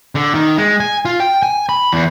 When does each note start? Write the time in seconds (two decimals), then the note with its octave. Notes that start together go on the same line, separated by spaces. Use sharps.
0.15 D3
0.34 D#3
0.58 G#3
0.80 G#5
1.05 F4
1.20 G5
1.43 G#5
1.69 B5
1.93 E2